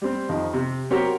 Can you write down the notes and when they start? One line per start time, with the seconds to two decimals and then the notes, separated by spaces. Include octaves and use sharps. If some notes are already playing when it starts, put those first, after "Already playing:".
0.02 G3 C4
0.29 F2 D#3
0.53 C3
0.90 F#3 C4 F#4 G4 A#4 C#5